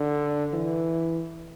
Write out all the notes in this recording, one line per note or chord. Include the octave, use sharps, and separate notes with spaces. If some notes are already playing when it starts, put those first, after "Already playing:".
Already playing: D3
E3